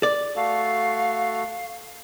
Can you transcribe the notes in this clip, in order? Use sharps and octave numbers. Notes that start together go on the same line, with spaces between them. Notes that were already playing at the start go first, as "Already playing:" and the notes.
D5
A3 F#4 A4 F5